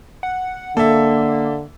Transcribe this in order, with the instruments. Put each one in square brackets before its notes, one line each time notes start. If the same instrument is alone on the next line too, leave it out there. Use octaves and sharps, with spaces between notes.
[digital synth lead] F#5
[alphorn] D3 [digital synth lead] A#3 [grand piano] A4 E5